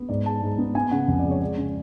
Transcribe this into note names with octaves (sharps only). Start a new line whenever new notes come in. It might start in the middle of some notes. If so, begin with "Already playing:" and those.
Already playing: B3
G#2 D5
G#3 A5
G#2
B3
B3 G#5
C#3 F#5
F2
D5
G#3
C#5
G#3 D5
C#3